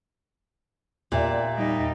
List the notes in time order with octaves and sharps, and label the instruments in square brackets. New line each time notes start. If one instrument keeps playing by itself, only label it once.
[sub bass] E2 [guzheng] A#2 [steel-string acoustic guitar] G4 D5 E5
[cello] G3 D#4